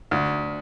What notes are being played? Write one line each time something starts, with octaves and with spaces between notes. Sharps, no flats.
D2